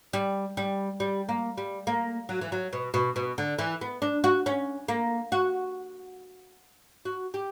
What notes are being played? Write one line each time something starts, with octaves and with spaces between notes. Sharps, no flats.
G3
G3
G3
A#3
G3
A#3
F#3
E3
F#3
B2
B2
B2
D3
E3
B3
D4
F#4
C#4
A#3
F#4
F#4
G4